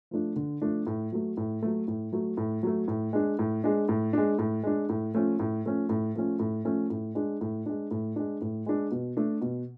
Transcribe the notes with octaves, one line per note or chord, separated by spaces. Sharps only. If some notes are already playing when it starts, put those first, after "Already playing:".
F3 A3 D4
D3
F3 A3 D4
A2
F#3 A3
A2
F#3 A3
A2
F#3 A3
A2
F#3 A3
A2
G#3 D4
A2
G#3 D4
A2
G#3 D4
A2
G#3 D4
A2
F3 A3 C#4
A2
F3 A3 C#4
A2
F3 A3 C#4
A2
F3 A3 C#4
A2
G#3 D4
A2
G#3 D4
A2
G#3 D4
A2
G#3 D4
B2
A3 D4
B2